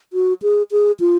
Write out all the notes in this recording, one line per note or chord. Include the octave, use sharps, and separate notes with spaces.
F#4
G#4
G#4
F4